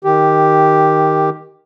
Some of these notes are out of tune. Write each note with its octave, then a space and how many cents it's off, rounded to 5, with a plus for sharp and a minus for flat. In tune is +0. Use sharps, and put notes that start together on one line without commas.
D#3 +0 G4 +0